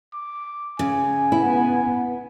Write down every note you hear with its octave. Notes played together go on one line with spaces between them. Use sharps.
D6
C#3 G#5
B3 E4